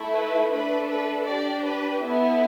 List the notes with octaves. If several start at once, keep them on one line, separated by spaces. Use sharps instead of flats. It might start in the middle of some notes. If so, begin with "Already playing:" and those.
Already playing: A3 E4 A4
B4
A3 D4 A4 B4
B4
D4 G4 D5
B4
B3 E4 A4 B4